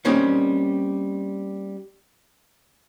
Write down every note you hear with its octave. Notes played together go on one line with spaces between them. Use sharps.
G3 A#3 C4 C#4 D#4